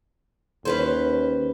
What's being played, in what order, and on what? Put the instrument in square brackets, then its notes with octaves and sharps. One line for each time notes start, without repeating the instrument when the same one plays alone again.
[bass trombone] D#2 [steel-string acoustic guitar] C#4 B4 C5